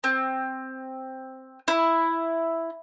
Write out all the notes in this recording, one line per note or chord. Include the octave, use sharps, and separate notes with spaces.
C4
E4